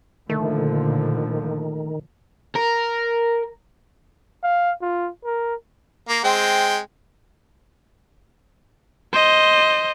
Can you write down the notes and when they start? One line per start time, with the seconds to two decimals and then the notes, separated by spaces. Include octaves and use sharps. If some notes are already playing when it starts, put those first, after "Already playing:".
0.29 A#2 D3 D#3 F3 A3
2.55 A#4
4.43 F5
4.82 F4
5.24 A#4
6.09 A#3
6.24 G#3 C4 G5
9.13 C5 D#5